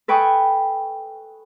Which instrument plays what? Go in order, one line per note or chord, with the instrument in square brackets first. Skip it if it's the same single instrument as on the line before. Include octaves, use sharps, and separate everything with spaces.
[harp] A4 B4 G5 G#5 C#6 D#6